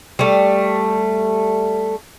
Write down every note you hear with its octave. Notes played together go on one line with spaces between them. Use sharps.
G3 A3